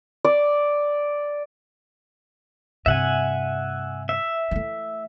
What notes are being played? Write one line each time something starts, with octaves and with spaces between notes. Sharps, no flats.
D5
G2 C3 E5 F#5 G#5
E5
E3 A3